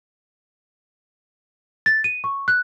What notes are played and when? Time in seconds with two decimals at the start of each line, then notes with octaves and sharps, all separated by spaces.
1.86 A6
2.04 D#7
2.24 C#6
2.48 F#6